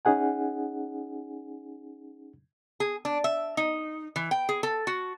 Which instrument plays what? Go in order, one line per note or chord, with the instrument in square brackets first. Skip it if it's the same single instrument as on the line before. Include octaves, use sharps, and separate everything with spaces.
[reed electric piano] C#4 D#4 G#4 F#5 G#5
[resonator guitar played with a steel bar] G#4
D4
E5
D#4
E3
G5
G#4
A4
F#4